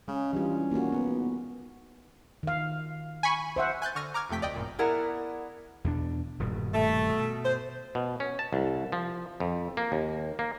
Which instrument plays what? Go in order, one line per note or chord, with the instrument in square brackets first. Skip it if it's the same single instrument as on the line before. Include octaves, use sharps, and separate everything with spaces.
[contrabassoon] C#3 [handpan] G#3 [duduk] C#4
[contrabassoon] G2 [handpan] E3 G3 F4
[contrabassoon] D#2 [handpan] A#3 F#4
[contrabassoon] B1 [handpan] B3
[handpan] D#3 F5
[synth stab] G#5 B5 C#6
[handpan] C5 E5 F#5
[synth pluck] G#5 F#6 G6 A6
D3 C#6 F6 A#6 D#7
A#5 D6 F6 G#6
F2 C3 A3 G5 B6
D2 D5 D#5 G5
G#1 F#2 A#2
[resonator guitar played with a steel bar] B3 E4 G#4 A#4 D5 F#5
[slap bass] E2 B2 D4
D#1 G2 B2
[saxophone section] A3
[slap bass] B2
[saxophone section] C5
[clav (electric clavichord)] B2
C#4
A5
C2
F3
F2
A#3
D#2
A#3